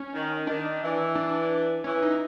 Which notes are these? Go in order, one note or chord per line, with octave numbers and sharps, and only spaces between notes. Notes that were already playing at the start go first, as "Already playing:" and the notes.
Already playing: C#4
D#3
D#3 D4
E3
D4
E3 C#4
D#4